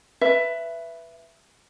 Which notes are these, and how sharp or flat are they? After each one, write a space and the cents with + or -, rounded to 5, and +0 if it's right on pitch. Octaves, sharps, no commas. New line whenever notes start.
B4 +0 E5 +15